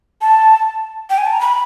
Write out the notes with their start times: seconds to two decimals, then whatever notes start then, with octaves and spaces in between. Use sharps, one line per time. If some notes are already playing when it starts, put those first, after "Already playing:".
0.21 A5
1.10 G5
1.18 G#5
1.25 A5
1.33 A#5
1.40 B5